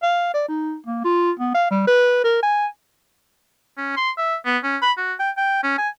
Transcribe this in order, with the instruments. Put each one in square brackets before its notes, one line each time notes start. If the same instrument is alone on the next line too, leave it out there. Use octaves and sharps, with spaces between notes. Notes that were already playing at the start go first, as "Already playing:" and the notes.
[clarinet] F5
D5
D#4
A#3
F4
B3
F5
G3
B4
A#4
G#5
[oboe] C#4
C6
E5
B3
C#4
B5
F#4
G5
G5
C#4
G#5